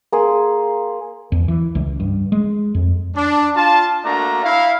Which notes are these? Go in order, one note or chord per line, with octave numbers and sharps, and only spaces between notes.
A#3 G#4 C6
E2
E3
C#2
G2
G#3
F2
D4
F4 A5
A3 A#3 D4 F#4 A#5
E4 F5